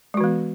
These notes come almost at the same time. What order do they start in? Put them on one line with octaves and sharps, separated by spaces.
G#3 F#4 E3 B3